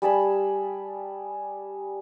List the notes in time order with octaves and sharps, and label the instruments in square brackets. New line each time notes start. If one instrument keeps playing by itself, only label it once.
[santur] G3 G#4 A5 B5